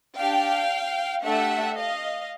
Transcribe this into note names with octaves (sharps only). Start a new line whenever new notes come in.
D4 G4 F5 G5
A3 D4 G4 E5 F#5
D#5 F5